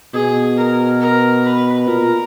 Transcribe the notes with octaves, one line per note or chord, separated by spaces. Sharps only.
B2 G#4
A#4
A#4
B4
A#2 A#4